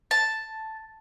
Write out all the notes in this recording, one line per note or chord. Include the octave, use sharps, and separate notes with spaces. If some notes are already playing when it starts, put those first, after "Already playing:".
A5